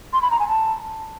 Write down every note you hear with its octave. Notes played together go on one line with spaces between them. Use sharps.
C6
B5
A#5
G#5
A5